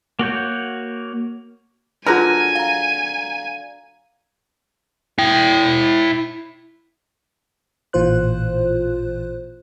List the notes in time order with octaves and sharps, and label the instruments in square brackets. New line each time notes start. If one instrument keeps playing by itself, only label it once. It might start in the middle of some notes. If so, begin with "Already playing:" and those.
[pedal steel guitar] A#3 F#4 C#5 G6
[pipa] D3 F#3 A#4 [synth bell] F4 G#4 B4 [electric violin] G#5
[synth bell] F5 A#5
[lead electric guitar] E4 G5
[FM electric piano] A1 A#2 E3 F4 C5 F#6